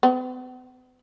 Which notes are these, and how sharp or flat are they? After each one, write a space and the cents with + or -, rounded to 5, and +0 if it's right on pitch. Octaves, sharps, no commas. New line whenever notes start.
B3 +45